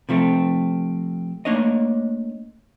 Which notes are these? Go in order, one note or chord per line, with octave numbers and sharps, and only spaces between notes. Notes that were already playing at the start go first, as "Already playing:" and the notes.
C3 F3 A3 C4
A3 A#3 D4 C#5 D#5